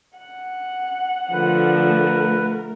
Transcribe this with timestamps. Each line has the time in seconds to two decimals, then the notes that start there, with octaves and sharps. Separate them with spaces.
0.18 F#5
1.32 D3 F3 A3 A#4 B4